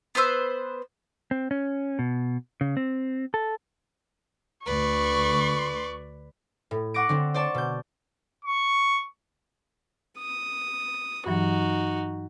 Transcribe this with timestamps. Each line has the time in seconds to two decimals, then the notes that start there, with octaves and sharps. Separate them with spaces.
0.15 B3 B4 C5 E6
1.31 C4
1.51 C#4
1.99 B2
2.61 C#3
2.77 C4
3.34 A4
4.66 D2 B4 D5 C#6
6.71 A2
6.94 F#5 C#6 D6 A#6 D7
7.09 D3 C4 D4
7.34 C5 D5 A5 C#6
7.54 B2 G6
8.45 C#6
10.19 D#6
11.26 G2 E3 F#3 D#4 F#4